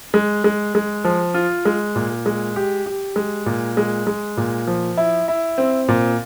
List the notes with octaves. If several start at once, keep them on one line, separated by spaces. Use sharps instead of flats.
G#3
G#3
G#3
F3
F4
G#3
A#2
G#3
G4
G4
G#3
A#2
G#3
G#3
A#2
F3
E4
E4
C4
A#2